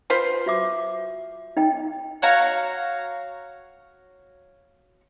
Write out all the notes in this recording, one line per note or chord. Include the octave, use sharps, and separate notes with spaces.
F4 B4 C5 G#5
F#4 E5 D6
D#4 D#5 G5
F#4 C#5 F5 A#5